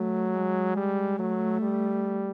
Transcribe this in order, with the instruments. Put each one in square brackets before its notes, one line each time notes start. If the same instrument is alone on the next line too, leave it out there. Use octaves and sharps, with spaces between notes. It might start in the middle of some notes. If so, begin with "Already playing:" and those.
Already playing: [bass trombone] F#3 [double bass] A3
[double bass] G#3
[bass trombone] G3
[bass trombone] F#3 [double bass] A3
[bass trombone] G3